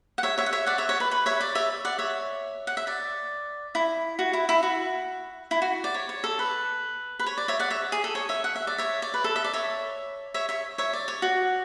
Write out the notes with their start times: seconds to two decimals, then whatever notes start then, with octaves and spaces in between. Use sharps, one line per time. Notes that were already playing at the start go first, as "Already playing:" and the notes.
0.18 F#5
0.23 C#5 E5
0.38 C#5 E5
0.46 F#5
0.53 C#5 E5
0.66 D5 F#5
0.78 C#5 E5
0.89 C#5
1.00 B4
1.11 B4
1.26 C#5 E5
1.41 D5
1.55 C#5 E5
1.85 D5 F#5
1.98 C#5 E5
2.67 F#5
2.77 E5
2.87 D5
3.75 E4
4.19 F#4
4.33 E4
4.49 E4
4.63 F#4
5.51 E4
5.62 F#4
5.84 D5
5.94 C#5
6.09 C#5
6.24 A4
6.39 B4
7.19 B4
7.26 C#5
7.37 D5
7.48 C#5 E5
7.59 D5 F#5
7.70 C#5 E5
7.92 G#4
8.04 A4
8.15 C#5
8.29 C#5 E5
8.44 F#5
8.56 E5
8.67 D5
8.78 C#5 E5
9.02 D5
9.14 B4
9.24 A4
9.36 E5
9.44 D5
9.53 C#5 E5
10.34 C#5 E5
10.49 C#5 E5
10.78 C#5 E5
10.93 D5
11.08 C#5
11.22 F#4